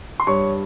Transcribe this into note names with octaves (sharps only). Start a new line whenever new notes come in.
C6
G2 C#5 C#6